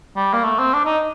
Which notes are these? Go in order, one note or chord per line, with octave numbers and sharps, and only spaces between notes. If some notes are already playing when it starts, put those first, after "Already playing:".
G3
A#3
A3
C4
D4
D#4